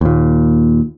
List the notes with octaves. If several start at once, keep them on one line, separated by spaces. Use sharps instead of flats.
D#2 A#2